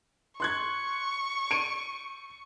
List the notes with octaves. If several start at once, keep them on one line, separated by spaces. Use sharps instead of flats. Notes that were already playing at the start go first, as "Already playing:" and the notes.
C6 C#6 F#6 G#6
D7 D#7